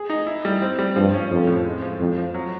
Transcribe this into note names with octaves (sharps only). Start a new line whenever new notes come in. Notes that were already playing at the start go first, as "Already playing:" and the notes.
Already playing: G#4
D#4
E4
G3
C4
G3
G2 F3
C#4
F2 F3
A2
G#3
F3
F2 F3
F3
F#3